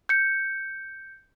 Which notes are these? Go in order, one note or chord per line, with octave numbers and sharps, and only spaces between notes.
G6 C#7